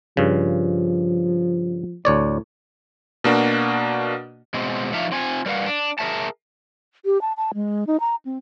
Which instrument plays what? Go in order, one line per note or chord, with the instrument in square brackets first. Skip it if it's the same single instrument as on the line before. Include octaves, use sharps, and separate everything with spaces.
[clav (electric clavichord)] G2 C#3 [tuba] F3
[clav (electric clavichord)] D2 C#5 D5 [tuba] A2
[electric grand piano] B2 A#3 D4 F#4
[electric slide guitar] B2 G#3 C4
F3 A3 D4 D#4 E5 F5
C4 F4 G#5
G3 A#4 B4 F5 F#5
D4
G#4 A#4 C5 E5 A5
[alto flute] G4
A5
A5
G#3
D#4
A#5
C4